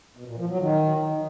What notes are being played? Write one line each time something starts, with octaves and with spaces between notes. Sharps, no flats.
B2
A#2
F3
F#3
D#3